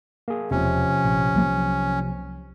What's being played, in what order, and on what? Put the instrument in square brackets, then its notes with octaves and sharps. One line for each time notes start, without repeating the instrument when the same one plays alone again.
[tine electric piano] A#3 G#4
[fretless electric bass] E1 [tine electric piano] C3 F3 [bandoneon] C#4
[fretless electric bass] A#1
C2 F#3 A#3